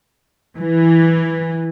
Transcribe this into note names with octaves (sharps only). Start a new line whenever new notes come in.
E3